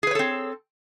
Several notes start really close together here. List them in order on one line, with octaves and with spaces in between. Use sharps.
G#4 B4 C#5 A4 C4